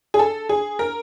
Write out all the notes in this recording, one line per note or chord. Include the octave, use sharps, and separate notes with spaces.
G#4
A4
G#4
A#4